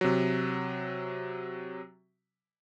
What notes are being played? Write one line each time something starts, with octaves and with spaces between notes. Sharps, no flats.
C3 F#3